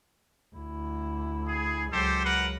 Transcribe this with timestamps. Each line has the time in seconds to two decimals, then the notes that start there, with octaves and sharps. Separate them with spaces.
0.55 D2 E4
1.47 G#4
1.92 C#2 F#3 G4 A4 C5
2.24 A#4 B4 F#5